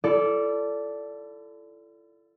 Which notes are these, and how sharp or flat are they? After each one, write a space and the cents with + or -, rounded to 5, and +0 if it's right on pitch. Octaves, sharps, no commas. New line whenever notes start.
E4 +45 A4 +0 D5 -15